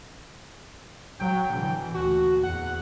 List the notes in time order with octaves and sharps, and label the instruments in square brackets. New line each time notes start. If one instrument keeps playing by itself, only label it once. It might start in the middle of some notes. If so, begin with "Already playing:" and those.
[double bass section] F#3 [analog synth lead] G5
[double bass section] B2 D3 E3
[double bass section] D2 A#2 [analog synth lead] F#4
[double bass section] E2 [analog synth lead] F#5